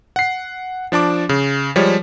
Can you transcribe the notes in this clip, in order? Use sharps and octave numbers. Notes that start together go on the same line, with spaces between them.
F#5 C7
F3 D4 A5 D6
C#3
F3 G3 G#3 C#5